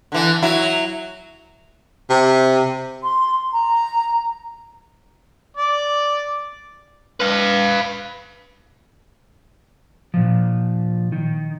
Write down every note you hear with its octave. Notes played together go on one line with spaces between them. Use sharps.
D3 E3
F#3 E4
C3
C6
A#5
D5
B4 F5
A#2 F3
D#3